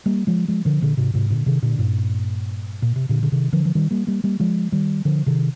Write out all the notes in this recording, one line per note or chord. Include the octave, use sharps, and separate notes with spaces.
G3 A#3
F3 G#3
F3 G#3
D3 F3
A#2 D3
G#2 C3
G#2 C3
A#2 D3
C3 D#3
A#2 D3
G2 A#2
A#2
C3
A#2 D3
D3
C3 D#3
D3 F3
F3
D#3 G3
G3 A#3
G3 A#3
G3 A#3
F3 G#3
D#3 G3
D3 F3
C3 D#3